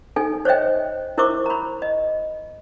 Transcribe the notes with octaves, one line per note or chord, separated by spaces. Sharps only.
D#4 A4 G#5
C5 C#5 D#5 E5 G5
E4 A#4 C5 E5 C#6 D6
A#5 B5
D#5